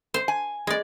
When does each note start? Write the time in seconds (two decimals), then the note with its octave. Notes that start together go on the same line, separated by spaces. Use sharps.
0.14 C5
0.28 G#5
0.67 G#3 D5